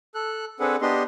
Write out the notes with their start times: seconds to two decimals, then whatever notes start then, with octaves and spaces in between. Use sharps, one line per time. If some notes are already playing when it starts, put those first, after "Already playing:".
0.15 A4 F#6
0.60 C4 D4 G#4 A4 B4 F#5
0.82 B3 D4 G4 D#5 C6